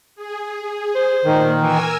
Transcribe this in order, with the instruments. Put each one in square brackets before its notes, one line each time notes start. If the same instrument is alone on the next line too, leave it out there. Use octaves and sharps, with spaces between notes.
[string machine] G#4
[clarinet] C5
[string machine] A#2 [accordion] D#3
[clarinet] E3 [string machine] A#4 G#5 E6